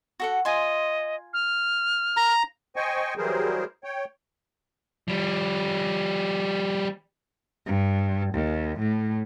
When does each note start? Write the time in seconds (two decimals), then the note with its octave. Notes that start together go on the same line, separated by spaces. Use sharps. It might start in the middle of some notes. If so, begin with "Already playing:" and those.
0.20 F#4 A4 F#5
0.45 F4 D#5 G#5 C6
1.33 F6
2.17 A#5
2.76 C5 D#5 G5 G#5 C#6
3.17 E3 F#3 G3 G#4 A#4 C5
3.84 C#5 G5
5.08 F3 G3
7.66 G2
8.34 D#2
8.79 A2